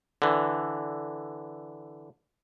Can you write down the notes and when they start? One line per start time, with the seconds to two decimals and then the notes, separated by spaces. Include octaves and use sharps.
0.22 D3 E3